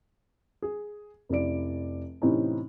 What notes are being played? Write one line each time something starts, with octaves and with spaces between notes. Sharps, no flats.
G#4
F1 C#4 E4 D5 D7
A2 C3 E3 C4 C#4 D#4